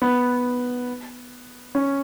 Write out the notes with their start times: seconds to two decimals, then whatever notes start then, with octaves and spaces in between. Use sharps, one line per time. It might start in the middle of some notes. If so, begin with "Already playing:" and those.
0.02 B3
1.75 C#4